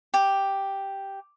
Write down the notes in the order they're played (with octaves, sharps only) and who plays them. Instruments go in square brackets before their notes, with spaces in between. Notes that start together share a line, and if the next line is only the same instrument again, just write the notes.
[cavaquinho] G4